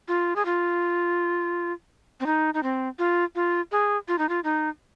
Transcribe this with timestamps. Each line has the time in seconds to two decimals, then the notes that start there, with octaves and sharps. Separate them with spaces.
0.08 F4
0.36 G#4
0.45 F4
2.20 C4
2.26 D#4
2.54 D#4
2.63 C4
2.99 F4
3.35 F4
3.72 G#4
4.08 F4
4.18 D#4
4.29 F4
4.44 D#4